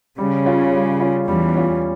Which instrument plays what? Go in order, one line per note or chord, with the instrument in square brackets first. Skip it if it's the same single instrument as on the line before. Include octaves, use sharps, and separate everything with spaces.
[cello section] C#3 [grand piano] G3
[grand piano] C#4 F4
G3
C#4 F4
[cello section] E2 E3 [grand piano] G3
[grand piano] C#4 F4